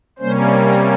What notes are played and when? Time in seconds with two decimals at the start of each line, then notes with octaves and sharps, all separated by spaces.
0.19 C3 G3 A#3 C#4 C5
0.62 A#4